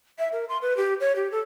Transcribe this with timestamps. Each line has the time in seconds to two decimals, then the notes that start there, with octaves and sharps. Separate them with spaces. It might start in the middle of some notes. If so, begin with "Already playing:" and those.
0.19 E5
0.33 A#4
0.49 C6
0.62 B4
0.77 G4
1.00 C#5
1.16 G4
1.32 A4